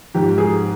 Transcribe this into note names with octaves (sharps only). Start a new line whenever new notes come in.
G#2 F3 G4
G#4